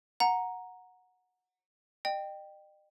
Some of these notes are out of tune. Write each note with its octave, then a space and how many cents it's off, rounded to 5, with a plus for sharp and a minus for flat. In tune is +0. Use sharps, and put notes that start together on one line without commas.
F#5 -10 A#5 +0
D#5 -40 G5 +0